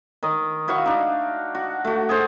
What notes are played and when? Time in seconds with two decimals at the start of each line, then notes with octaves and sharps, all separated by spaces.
0.23 D#3 D#5
0.68 E4 F#4 F5 C#6
0.86 D4 D#4
1.55 F#4
1.85 A3 F#4
2.09 G#4 A4 C5